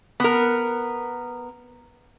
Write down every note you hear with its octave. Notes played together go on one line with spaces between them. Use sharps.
B3 A#4